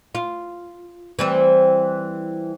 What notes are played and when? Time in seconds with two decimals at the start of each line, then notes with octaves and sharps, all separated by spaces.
0.15 F4
1.19 E3 G3 C4